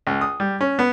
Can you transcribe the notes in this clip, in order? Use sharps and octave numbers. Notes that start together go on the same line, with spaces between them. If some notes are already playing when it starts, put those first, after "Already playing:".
C#2
D#6
G3
C#4
B3